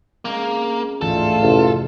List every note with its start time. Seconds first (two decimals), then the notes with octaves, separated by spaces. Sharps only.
0.25 G#3 A#3 C4 C#4
1.01 A1 D2 G#2 A3 F4 A4
1.42 A1 F2 C3